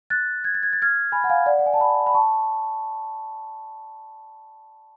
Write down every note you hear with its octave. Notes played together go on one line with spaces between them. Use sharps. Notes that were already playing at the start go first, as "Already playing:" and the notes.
F#6 A6
G#6
A6
G#6
A6
F6 G#6
G#5 B5
F#5
F5 G#5
D5 F#5
F#5
G#5
A5
G#5 B5
B5
A5 C#6